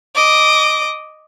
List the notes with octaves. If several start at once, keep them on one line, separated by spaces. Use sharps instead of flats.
D#5 D6